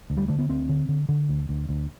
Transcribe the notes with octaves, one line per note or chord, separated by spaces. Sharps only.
D2
G3
D3 A3
B3
D2 C4
D3
D3
D3
D2
D2
D2